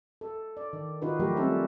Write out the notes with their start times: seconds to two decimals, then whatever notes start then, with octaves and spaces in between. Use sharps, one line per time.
0.21 A4
0.57 D5
0.73 D#3
1.02 D#3 D#4 F4 F#4 B4
1.20 F3 F#3 A3 G4 A#4
1.37 G3 C4 C#4 D#4 A4